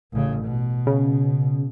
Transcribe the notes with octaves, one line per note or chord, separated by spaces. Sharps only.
A1 C#3
B2
C#3